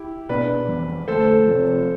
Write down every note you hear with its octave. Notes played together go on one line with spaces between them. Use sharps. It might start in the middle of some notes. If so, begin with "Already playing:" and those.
Already playing: E4 G4
B2 B3 D4 B4 D5
F2 E3 G3
F2 D3 A3 A4 C5
C3 F3 C4